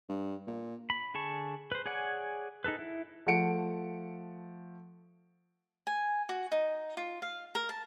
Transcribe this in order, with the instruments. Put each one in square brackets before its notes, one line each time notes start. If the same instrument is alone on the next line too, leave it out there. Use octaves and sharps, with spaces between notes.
[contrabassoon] G2
A#2
[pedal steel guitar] B5
D3 G#4 A5 C#6
B4 C5
G#4 C#5 D5 F#5 G#5
D#4 G#4 A4 B4
E4
[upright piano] F3 A3 F#5 C#7 D7
[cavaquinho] G#5
F#4
D#4
F4
F5
A#4
A5